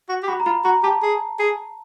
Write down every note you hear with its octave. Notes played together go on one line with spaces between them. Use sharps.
F#4
G4
F#4 B5
A#5
F4 B5
F#4 A#5
G4 A5
G#4
G#4